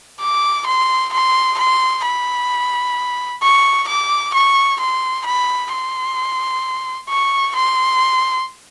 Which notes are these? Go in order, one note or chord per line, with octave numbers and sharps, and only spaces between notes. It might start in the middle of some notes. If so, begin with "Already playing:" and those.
D6
C6
C6
C6
B5
C#6
D6
C#6
C6
B5
C6
C#6
C6